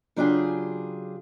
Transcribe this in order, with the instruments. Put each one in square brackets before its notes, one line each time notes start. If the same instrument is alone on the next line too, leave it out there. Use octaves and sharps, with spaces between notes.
[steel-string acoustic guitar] C#3 F#3 D4 F4 G4 G#4